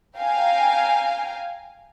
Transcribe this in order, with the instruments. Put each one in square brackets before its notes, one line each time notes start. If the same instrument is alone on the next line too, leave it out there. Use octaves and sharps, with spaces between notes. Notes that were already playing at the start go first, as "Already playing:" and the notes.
[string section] F5 G5 G#5 A#5